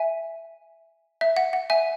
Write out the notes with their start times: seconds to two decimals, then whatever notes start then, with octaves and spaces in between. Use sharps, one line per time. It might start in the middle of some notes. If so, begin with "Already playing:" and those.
Already playing: E5 G#5
1.21 E5
1.37 F#5
1.53 F#5
1.70 E5 G#5